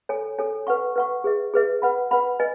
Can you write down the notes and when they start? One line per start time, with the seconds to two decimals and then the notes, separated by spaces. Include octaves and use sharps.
0.09 A4 C#5 G#5
0.39 A4 C#5 G#5
0.67 B4 F#5 C#6
0.96 B4 F#5 C#6
1.24 G#4 B4 E5
1.54 G#4 B4 E5
1.82 B4 F#5 B5
2.11 B4 F#5 B5
2.40 B4 D#5 G#5